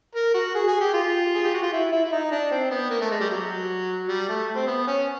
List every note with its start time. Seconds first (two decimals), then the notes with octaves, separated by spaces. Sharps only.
0.15 A#4
0.34 F#4
0.55 G#4
0.68 G#4
0.81 G4
0.94 F4
1.35 G#4
1.44 G4
1.54 F#4
1.63 F4
1.73 E4
1.93 E4
2.05 E4
2.12 D#4
2.31 D4
2.51 C4
2.71 B3
2.90 A#3
3.01 A3
3.11 G#3
3.21 G3
3.30 F#3
4.09 G3
4.29 A3
4.56 C4
4.67 B3
4.87 C#4